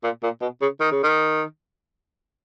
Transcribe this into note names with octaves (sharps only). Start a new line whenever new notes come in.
A#2
A#2
B2
C#3
D#3
C#3
D#3